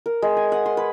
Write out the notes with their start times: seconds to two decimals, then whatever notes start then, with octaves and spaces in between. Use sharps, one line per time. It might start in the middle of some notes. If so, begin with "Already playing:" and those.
0.06 A#4
0.22 G#3
0.37 G#5
0.52 F#5
0.66 C6
0.77 B4